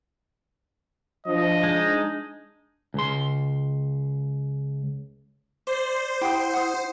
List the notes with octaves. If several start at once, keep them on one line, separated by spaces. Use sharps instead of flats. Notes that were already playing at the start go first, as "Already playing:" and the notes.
F3 D4 D#5
G#3 D#4
C#2 C6
C5 D5
E4 G4 F#5 D#6
F#5 D#6